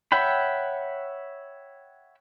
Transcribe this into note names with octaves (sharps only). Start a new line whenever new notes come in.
C#5 E5 F#5 G5 B5